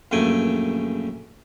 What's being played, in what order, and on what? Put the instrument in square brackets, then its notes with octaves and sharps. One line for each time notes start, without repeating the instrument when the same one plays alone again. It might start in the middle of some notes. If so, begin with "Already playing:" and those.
[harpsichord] A#1 F#2 C#3 A3 G5 G#5